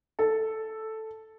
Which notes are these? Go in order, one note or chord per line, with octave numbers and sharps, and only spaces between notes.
A4